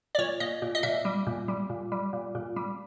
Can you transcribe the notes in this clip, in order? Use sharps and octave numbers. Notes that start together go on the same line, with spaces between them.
D5
A#2 C#5
A#2 D#5
A#2
D#5
A#2 E5
G3
A#2
G3
A#2
G3
A#2
A#2
G3